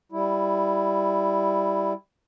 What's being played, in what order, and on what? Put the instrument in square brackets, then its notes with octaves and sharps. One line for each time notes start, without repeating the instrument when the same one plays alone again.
[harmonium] G3 E4